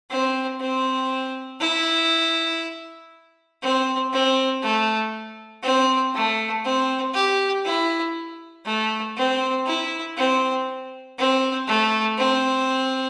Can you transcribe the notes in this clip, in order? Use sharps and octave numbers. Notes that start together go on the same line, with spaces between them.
C4
C4
E4
C4
C4
A3
C4
A3
C4
G4
E4
A3
C4
E4
C4
C4
A3
C4